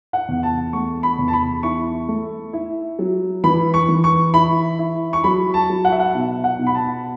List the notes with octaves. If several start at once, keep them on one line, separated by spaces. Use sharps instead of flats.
F#5
E2
A5
A3 C#6
B5
E2
A5
B5
E4 C#6
A3
E4
F#3
E3 B5
C#6
E3
C#6
E4 B5
E4
C#6
F#3 B5
A5
F#3
F#5
E5
F#5
B2
F#5
B2
B5
A5